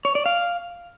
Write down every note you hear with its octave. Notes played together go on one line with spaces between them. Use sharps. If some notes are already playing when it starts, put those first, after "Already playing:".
C#5
D5
F5